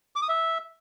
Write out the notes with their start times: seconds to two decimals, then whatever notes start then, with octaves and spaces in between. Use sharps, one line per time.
0.16 D6
0.22 D#6
0.29 E5